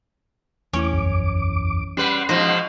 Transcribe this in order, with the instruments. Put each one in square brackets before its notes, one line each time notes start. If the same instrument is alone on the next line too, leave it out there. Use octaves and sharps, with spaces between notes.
[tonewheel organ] E2 D6 [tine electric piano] A3 E4 [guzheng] C#4 C#5
[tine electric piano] A#1 F#2
[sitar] G3 B4 [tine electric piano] C#4 [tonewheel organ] F#5 C6
[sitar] G#2 B2 F3 [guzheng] C5 D#5